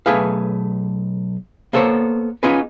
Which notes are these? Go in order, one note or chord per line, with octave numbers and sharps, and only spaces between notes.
B1 B2 A3 G#4 B4 F5
A#3 B3 A4 C5 C#5
B3 C#4 D#4 F4 G#4 B4